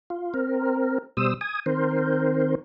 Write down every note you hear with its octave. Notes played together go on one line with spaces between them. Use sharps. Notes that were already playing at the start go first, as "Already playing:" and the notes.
F4
C4 A#4
B2 G3 C5 D#6 E6
G#5 D#6
D#3 C4 A#4 C5